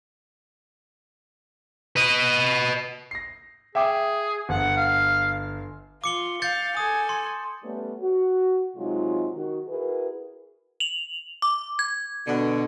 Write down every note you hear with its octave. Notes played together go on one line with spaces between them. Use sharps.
B4 D#5
A#6 C7
G#4 E5 G5 D6
G1 F#5
F5
F4 D6 C#7 G7
F5 G6 A6 C#7
A4 G#5 D#6
C6
G3 A3 B3 C#4
F#4
C3 F#3 G#3 D#4 F4
D#3 F#4
E4 F#4 G#4 A#4 B4
F7 F#7
D6
G#6
B2 D3